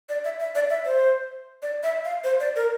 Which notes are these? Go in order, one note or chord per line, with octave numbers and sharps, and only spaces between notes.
D5
E5
E5
D5
E5
C5
D5
E5
F5
C5
D5
A#4